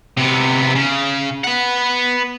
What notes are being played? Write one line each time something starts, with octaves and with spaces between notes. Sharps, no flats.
C3 B3
C#3
B4 F#5